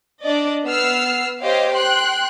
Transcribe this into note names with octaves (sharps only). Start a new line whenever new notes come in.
D4 D5 D#5
B3 E6 F6 C7
G4 C5 C#5 D#5 F5
G5 C6 F#6